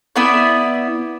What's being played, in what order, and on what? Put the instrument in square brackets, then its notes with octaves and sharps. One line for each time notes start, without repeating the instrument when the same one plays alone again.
[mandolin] B3 E4 D5